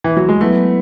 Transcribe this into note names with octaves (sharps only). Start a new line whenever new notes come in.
E3
F#3
G#3
F#3 A3 B3 E4 B4